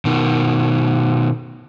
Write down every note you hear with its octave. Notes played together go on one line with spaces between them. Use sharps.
B2 D#3